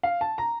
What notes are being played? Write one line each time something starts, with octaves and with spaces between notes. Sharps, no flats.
F5
A5
A#5